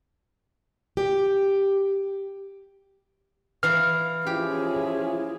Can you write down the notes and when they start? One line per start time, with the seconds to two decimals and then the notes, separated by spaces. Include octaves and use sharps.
0.97 G4
3.63 E3 F5 A#5 F6
4.27 F3 C#4 E4 F4 G4 G#4